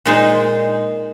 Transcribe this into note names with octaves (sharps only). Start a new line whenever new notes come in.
A#2 G#3 D#4 G#4 C5